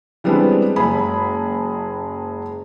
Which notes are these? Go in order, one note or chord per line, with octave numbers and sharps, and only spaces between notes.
E3 G3 G#3 B3 C4 D4
F#1 G#3 G#4 B5